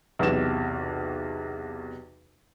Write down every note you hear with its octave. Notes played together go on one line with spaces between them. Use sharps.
B1 E2 C3 E7